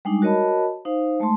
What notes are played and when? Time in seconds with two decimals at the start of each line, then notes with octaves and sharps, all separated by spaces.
0.05 G3 G#3 D4 D#4
0.22 F#4 A#4 C#5 D#5 A5 B5
0.85 D#4 C5 F5
1.20 G#3 A3 A5 C6